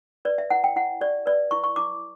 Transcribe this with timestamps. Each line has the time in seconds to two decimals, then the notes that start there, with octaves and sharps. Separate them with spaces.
0.25 B4 D5
0.38 E5
0.50 E4 F#5
0.64 G5
0.76 E4 F#5
1.01 G4 D5
1.26 B4 D5
1.51 E4 C#6
1.64 C#6
1.76 E4 D6